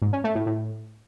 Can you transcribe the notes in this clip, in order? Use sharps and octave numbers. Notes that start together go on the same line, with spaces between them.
G#2
C#4
A3
A2
A2